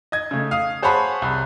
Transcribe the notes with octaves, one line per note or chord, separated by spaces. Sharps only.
D#5 G#6
C#3 A3
F5 D#6
G#4 C5 C#5 F#5 A5 B5
C2